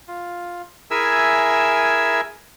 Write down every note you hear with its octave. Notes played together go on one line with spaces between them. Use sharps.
F4
E4 G#4 A#4 E5 G#5 E6